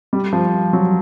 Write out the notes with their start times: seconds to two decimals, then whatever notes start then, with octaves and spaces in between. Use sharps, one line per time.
0.13 G3
0.33 F3
0.73 F#3